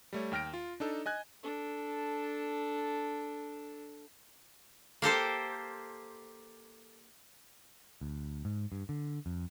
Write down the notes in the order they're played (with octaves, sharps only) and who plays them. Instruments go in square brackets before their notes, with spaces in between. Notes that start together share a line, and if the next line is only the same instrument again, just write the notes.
[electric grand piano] G3 A3 C#5
D#2 G5 F6 A#6 D7
F4
D4 D#4 A4
D#5 G#5 F#6 G#6
[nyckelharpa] D4 A4
[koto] A#3 G4 A4 C5
[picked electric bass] D2
G#2
G2
D3
F2